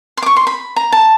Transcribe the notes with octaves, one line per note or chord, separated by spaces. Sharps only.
C6
D6
C#6
C6
B5
A#5
A5